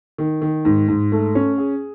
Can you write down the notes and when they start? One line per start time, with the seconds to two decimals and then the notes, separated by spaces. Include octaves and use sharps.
0.18 D#3
0.42 D#3
0.65 G#2
0.88 G#2
1.12 A3
1.35 C#4
1.58 G#4